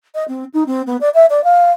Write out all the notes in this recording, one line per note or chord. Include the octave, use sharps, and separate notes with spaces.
D#5
C4
D#4
C4
B3
D5
E5
D5
F5